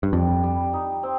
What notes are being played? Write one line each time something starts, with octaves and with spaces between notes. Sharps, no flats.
G2
F2 G3
G3
D#4
C4